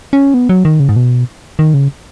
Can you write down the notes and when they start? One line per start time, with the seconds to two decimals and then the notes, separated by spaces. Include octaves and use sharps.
0.13 C#4
0.34 B3
0.49 F#3
0.65 D#3
0.80 C#3
0.89 G#2
0.96 B2
1.59 D#3
1.74 C#3